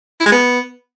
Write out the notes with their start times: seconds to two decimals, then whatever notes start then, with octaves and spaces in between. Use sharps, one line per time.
0.20 E4
0.26 G#3
0.32 B3